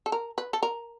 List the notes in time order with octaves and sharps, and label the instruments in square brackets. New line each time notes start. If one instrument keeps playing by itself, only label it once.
[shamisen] A4
A#4
B4
A4
A#4